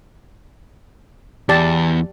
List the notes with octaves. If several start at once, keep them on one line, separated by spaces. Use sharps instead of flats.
E2 G4 D5 A5